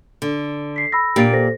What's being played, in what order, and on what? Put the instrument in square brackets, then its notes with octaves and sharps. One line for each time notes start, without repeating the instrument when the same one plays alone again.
[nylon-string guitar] D3
[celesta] B6 C7
B5 E6 A#6
[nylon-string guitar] A#2 A#3 G4 [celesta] D4 A6 D7
[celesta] A4 C5 A#6